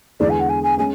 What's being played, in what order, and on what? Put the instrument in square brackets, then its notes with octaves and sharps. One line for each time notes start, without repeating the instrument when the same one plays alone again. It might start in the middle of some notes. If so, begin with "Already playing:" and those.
[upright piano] E2 D3 G#3 B3 D4 [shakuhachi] D5
[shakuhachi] G#5
F#5
G#5
G#5
[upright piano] G#3 C#4 [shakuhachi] G#5